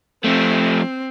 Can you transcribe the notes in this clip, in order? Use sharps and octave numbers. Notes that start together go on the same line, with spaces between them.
F3 A3 C4